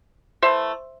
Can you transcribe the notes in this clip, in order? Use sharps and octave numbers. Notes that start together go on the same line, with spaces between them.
E3 A3 C5 E5